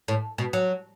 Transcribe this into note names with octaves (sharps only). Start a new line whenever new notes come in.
A2
B2
F#3